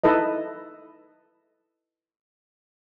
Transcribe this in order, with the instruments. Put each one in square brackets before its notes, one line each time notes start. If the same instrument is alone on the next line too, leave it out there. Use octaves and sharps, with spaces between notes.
[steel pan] D#4 E4 A4 B4 D#5